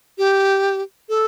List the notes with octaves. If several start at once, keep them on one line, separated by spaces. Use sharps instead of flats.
G4
A4